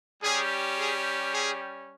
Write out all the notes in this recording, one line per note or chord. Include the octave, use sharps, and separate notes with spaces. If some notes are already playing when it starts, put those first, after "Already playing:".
G3 C#4 G4 G#4
G#4
G#4